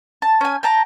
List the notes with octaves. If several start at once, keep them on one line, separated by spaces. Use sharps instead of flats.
A5
C#4 G#5
G5 A5 A#5